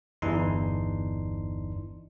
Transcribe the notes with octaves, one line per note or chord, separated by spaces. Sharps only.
G1 E2 E3 D4 D#4 C6